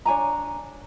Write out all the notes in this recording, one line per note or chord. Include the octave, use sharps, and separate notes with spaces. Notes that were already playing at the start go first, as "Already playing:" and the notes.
D4 C#5 G#5 A#5